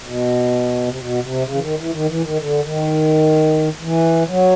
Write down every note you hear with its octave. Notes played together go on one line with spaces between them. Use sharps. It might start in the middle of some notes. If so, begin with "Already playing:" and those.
B2
C3
B2
C3
C#3
E3
D#3
E3
D#3
E3
D#3
D3
D#3
E3
F#3